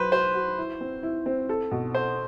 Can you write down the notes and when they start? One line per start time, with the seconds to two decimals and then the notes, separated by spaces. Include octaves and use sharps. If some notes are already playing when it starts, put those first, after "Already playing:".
Already playing: F#3 B4 C5
0.12 F#4 C5
0.34 F#4
0.58 E4
0.81 C4
1.03 E4
1.26 C4
1.49 A4
1.71 B2
1.94 A4 C5